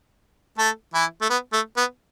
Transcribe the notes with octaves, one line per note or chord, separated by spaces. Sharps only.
A3 A4
E3 E4
A3
B3
A3
B3